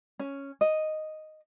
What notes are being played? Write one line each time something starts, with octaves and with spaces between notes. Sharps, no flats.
C#4
D#5